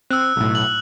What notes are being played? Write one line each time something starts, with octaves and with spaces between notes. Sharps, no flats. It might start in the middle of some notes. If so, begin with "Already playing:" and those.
C4 E6 F#6
B1 A2
F#7